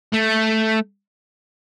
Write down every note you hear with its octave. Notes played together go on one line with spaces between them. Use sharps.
A3